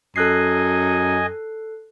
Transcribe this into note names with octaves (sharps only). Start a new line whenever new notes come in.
F#2 A4 D#5 G#5 F#6 C7